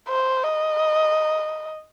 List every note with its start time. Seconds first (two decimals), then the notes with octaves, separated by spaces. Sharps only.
0.09 C5
0.44 D#5